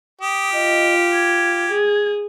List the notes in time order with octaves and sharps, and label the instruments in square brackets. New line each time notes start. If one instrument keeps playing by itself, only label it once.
[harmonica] G4 [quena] D#6
[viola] F4 [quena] D#5
[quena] G#6
[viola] G#4